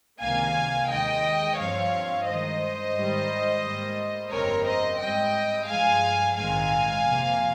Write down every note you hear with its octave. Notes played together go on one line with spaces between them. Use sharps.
C#2 C3 D#3 A#3 F5 G#5
D#2 D#3 G#3 D#5 G5
G2 F3 C4 C#5 F5
G2 D#3 G#3 C5 D#5
G#2 D#3 G3
G#2 G3 A#3
G1 F2 C#3 G3 C4 A#4 C#5
C5 D#5
G#2 G3 C4 D#5 G5
G2 F3 G#3 F5 G#5
A#1 G#2 D#3 G#3 C4 F5 G#5
F2 C3 F3 A#3